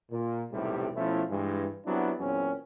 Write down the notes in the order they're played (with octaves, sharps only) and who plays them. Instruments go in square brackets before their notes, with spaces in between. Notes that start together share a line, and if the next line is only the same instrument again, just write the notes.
[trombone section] A#2
B1 E2 A2 C3 G3
B2 F3 A3 C#4 E4
G2 E3 G#3
F#3 G3 B3 C4 D4 E4
E2 A#2 F#3 C4 C#4